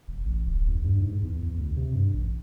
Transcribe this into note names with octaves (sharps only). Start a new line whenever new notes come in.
F1
A1
D1
D#2
G2
G#2
E2
E2
D2
C3
G2
A1